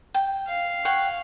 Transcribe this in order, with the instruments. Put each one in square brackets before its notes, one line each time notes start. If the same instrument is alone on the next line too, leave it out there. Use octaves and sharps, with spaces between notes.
[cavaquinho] G5
[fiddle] F5
[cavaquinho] C#5 F#5 G5